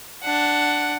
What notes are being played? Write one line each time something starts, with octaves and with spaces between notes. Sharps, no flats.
D4 F#5